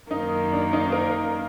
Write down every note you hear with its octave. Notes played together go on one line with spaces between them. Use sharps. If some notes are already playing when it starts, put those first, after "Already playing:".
F#2 D#3 A#3 D#4
D4
D#4
A#4